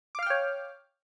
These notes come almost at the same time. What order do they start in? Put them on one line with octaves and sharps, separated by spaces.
D6 F5 F6 G5 C#5